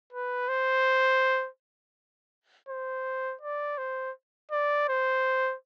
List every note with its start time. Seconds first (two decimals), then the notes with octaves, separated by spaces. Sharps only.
0.13 B4
0.49 C5
2.69 C5
3.42 D5
3.78 C5
4.52 D5
4.89 C5